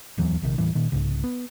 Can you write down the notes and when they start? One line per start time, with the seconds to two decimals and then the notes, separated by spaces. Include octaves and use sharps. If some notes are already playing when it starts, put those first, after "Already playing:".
0.18 D1 E2 E3 F#3
0.42 A#1 C3 D#3
0.58 D#2 A2 E3 G3
0.75 A#2 D#3
0.92 C2 G#2 C#3
1.24 B3